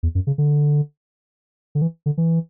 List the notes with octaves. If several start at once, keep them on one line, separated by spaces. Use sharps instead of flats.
E2
F#2
C#3
D3
D3
E3
D3
E3